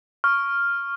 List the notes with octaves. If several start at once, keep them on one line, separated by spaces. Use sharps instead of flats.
C#6 F6